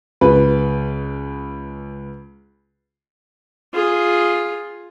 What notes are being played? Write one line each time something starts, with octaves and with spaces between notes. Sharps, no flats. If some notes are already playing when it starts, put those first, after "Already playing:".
C#2 B4
F4 G#4